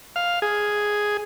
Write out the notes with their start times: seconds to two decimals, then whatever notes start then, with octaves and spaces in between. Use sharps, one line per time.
0.16 F5
0.42 G#4